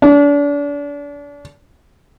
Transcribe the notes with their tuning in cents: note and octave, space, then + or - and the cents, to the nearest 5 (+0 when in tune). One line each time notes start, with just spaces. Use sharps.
D4 -35